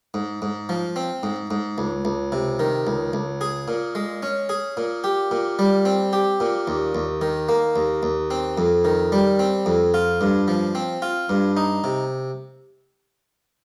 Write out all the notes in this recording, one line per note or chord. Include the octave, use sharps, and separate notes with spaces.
G#2
G#2
F3
C4
G#2
G#2
C#2
C#2
C3
D#3
C#2
C#2
G#4
A#2
G#3
C#4
G#4
A#2
G4
A#2
G3
C4
G4
A#2
D#2
D#2
D#3
A#3
D#2
D#2
C4
F2
D#3
G3
C4
F2
F4
G2
F3
C4
F4
G2
D#4
C3